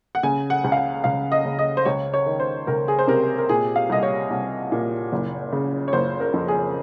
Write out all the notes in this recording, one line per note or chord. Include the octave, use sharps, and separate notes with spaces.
F#5
C#3 G#5
F#5
C#2
F5
F#5
C#2 F5
D#5
C#3
D#5
C5
C#2 C#5
C#5
D#3
C5
C#2 A#4
G#4
C5
C3 A#4
A#4
A#2 G#4
F5
C2 D#5
C#5
C2
A#2
F#1
C#3
C#5
F#1 C5
A#4
F2
G#4